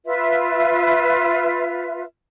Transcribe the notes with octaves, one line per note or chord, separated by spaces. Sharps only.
F4 B4 E5